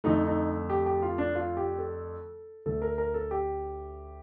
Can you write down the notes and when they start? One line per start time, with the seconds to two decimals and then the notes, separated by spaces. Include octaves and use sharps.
0.04 F2 D3 A3 D#4
0.26 D#4
0.70 G4
0.86 G4
1.02 F4
1.18 D4
1.35 F4
1.57 G4
1.79 A4
2.66 D2 D3 A3 A4
2.82 A#4
2.98 A#4
3.14 A4
3.31 G4